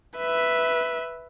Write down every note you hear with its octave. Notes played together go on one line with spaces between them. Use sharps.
B4 E5